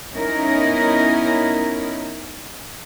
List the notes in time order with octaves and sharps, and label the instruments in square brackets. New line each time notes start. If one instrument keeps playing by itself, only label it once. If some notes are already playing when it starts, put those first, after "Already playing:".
[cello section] B3 C#4 D#4 E4 A#4